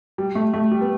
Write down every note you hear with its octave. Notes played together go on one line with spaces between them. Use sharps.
G3
A3
A3
G3
B3